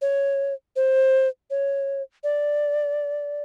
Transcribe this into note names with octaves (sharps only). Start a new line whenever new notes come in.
C#5
C5
C#5
D5